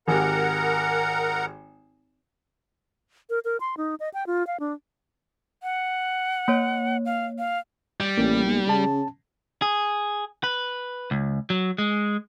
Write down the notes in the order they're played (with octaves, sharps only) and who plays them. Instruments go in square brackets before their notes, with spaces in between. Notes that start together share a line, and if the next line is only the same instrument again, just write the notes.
[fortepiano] G#1 G4 [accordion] A#4 F#5 A#5
[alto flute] A#4
A#4
C6
D#4
D#5
G5
F4
F5
D4
[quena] F#5
[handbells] A#3 C#5
[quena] F5
F5
[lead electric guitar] G3
[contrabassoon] A1 [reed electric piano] A#3
[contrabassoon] B1
[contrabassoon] C#3 [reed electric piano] C#4 A5
[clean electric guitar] G#4
B4
C#2
F#3
G#3